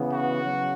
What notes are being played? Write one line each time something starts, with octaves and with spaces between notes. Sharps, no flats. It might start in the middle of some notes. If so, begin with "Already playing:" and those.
Already playing: C#3 E3 B3
F#4
C#3 F#3